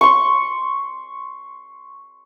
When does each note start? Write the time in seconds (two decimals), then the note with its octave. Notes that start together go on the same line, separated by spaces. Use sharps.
0.01 C6 C#6